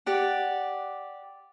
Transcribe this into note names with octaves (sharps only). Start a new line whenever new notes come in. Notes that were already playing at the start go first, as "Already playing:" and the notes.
G4 D5 F#5